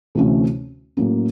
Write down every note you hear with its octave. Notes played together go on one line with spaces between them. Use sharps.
D2 C3 E3 A3 C#4
A2 F#3 A#3 C#4